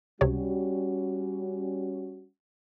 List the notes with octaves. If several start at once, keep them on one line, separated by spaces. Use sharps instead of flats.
C#2 C3 G3 C#4 F#4 C#5